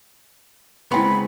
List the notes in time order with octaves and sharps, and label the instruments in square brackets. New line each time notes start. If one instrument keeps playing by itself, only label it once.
[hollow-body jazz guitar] C#3 B3 [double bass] G#3 C4 [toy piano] E4 G5 C6 [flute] B5